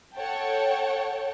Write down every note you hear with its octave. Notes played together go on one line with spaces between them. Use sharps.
A4 C#5 F#5 G5 A5